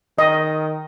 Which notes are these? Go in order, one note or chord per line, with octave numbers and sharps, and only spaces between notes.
D#3 D#5